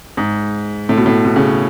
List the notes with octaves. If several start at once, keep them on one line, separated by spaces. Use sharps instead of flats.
G#2
A2
B2
A2
B2
C#3